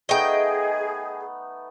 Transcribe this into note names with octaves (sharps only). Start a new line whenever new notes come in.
A3 B3 D#4 G#4 D#5 G5